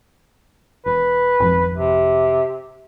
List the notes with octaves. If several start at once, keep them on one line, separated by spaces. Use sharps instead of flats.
E1 B4
G#1 F2 F3
C3